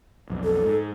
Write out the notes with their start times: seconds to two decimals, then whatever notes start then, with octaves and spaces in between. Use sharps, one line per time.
0.30 B1 F2
0.44 A4
0.65 G#2